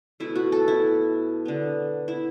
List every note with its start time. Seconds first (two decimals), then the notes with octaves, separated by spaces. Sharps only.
0.20 B2 A3 E4
0.36 F#4
0.52 A4
0.68 E4
1.46 D3 B3
2.08 E4